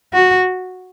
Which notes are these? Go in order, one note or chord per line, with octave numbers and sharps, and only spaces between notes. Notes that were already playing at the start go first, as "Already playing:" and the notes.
F#4